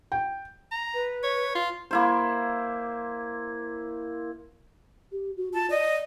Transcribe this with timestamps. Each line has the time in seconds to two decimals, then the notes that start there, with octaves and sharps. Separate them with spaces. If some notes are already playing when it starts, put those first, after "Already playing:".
0.12 G5
0.71 A#5
0.94 B4
1.23 C#5
1.55 F4
1.91 A#3 E4 C5
5.12 G4
5.37 F#4
5.54 F4 A5
5.70 D5 D#5